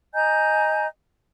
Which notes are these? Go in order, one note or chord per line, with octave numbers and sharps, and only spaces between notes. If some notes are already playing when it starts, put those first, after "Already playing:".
D#5 G#5 A#5 G6